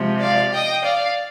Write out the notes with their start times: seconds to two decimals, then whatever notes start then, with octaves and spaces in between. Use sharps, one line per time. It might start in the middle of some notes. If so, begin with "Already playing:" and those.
Already playing: C3 F3 G#3
0.20 D5 F5
0.52 D#5 G5
0.84 D5 F5